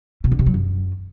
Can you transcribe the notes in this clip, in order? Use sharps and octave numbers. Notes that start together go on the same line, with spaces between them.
B2
D3
C3
F#3
F#2